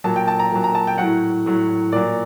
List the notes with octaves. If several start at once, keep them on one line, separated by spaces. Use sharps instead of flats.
A#2 F#3 A5
G5
A5
A#5
A#2 F#3
A#5
A5
G5
A2 F#3 F#5
A2 F#3
A#2 F#3 D5